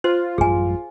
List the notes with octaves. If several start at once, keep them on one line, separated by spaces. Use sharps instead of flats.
F4 C5
A1 F#2 G3 G#4 G#5